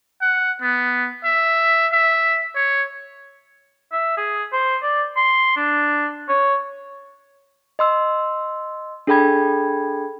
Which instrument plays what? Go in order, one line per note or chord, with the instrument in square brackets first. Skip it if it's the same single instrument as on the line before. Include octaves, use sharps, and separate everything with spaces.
[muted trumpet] F#5
B3
E5
E5
C#5
[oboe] E5
G#4
C5
D5
C6
D4
C#5
[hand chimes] D#5 C6 E6
D4 G#4 A4 G5 B5 G#6